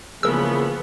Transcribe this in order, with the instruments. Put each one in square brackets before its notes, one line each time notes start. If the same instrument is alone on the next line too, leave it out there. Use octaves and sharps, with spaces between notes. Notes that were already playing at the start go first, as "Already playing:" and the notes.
[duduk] C#3 [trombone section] E3 A#3 G#4 [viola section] F3 B3 [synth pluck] A#4 E6